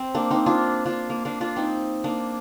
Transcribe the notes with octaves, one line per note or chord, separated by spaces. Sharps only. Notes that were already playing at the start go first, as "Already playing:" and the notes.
Already playing: C4
A#3 D4
C4 D#4
D4 F4
D4 F4
A#3
A#3 D4
D4 F4
C4 D#4
A#3 D4